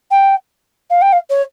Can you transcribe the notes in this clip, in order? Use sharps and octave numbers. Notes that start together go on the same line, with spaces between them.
G5
F5
G5
F5
C#5